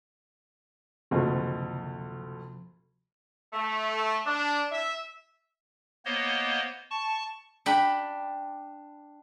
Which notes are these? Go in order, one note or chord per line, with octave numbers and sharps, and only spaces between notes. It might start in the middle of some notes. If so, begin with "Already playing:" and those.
F#1 D2 C3 F3
A3
D4
E5
A#3 B3 C5 C#5 D#5
A5 C#6
D4 G5 B5